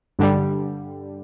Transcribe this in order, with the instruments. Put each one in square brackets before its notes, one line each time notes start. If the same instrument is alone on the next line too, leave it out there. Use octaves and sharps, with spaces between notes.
[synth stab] G2 D3 G3